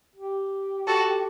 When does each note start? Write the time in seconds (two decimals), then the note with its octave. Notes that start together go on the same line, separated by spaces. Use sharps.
0.16 G4
0.87 F#4 A4